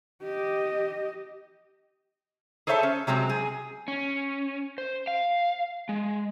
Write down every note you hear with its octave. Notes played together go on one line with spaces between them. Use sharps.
G4 D#5
G#4 A4 C5 C#5 E5 A5
C#4
C3 F#3 G#3 C4
G#4
C#4
C5
F5
G#3